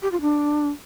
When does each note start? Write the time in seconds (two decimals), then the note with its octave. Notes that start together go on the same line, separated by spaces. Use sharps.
0.02 G4
0.12 F4
0.21 D4